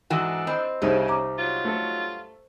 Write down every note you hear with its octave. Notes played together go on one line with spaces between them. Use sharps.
G#2 E3 D4 D#4 F#4 A4
C4 D#5 B5
C2 C#3 G3 D#4 C5
A#5 D6
G2 F#3 F4
A3 A4